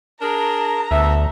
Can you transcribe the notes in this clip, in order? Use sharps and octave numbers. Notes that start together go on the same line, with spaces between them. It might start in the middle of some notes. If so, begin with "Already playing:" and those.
D4 G#4 A#4 A#5
D2 A3 B3 E5